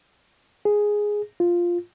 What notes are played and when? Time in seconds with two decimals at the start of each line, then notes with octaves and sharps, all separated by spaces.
0.65 G#4
1.40 F4